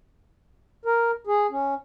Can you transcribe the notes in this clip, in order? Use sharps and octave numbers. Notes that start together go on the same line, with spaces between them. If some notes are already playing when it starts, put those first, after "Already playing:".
A#4
G#4
C#4